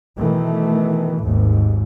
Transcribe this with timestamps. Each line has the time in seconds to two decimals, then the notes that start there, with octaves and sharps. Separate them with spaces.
0.20 B2 D#3 E3 A3
1.23 G#1 D#2 G#2